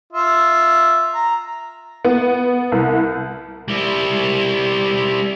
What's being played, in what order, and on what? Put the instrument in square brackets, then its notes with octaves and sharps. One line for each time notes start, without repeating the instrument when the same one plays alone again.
[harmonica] F4 E5
A#5
[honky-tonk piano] B3
C2
[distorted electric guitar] G3 E4